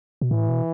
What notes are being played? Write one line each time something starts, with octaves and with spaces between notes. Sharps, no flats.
B2
A2 E3
B2